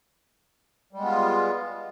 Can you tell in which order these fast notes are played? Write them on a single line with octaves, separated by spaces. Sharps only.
G3 G#3 B3 F4